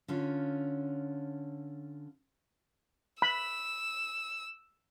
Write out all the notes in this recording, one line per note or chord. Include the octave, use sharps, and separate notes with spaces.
D3 C#4 F4
B5 E6